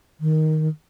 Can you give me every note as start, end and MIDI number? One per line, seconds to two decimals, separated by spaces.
0.20 0.68 51